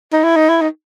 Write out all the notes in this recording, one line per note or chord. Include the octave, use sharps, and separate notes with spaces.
D#4
E4
D#4
E4
D#4